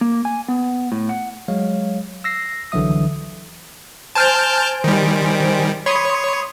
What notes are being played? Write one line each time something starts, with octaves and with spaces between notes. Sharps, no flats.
A#3
G#5
B3
A2
F#5
F#3 G#3 C#5 F5
E6 A#6 C7
C2 D3 E3 F#3 E5 D#6
C5 G#5 A5 F6 G6 D7
D#3 G3
C#5 B5 C6 D#6